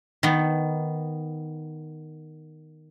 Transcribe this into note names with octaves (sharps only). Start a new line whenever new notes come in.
D#3 B3